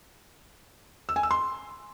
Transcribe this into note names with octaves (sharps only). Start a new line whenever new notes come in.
E6
G#5
E6
C6